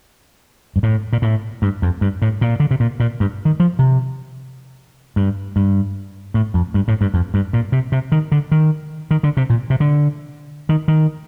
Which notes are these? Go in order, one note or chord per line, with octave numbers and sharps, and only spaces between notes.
G2
A2
A#2
A2
G2
F2
G2
A2
A#2
D3
C3
A#2
A#2
G2
D#3
F3
C3
G2
G2
A2
F2
G2
A2
G2
F2
G2
A#2
C3
C3
D#3
D3
D#3
D#3
D3
C3
A#2
C3
D3
D#3
D#3